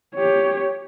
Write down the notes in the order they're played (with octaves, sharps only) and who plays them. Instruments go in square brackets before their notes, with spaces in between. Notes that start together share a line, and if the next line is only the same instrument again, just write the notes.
[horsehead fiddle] G4 C#5